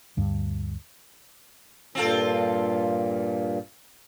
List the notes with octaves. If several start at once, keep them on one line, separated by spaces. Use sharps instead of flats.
D2 G2
G2 A#2 C4 F4 A4